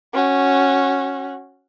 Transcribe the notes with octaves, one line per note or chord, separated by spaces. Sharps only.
C#4 F#4